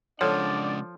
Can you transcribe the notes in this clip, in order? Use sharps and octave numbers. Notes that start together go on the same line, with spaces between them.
C#3 F3 G#3 D4 A4 C#5 D5 F#5